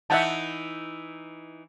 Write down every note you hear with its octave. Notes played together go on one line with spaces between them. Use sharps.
E3 D#4 E4 E5 F#5 A5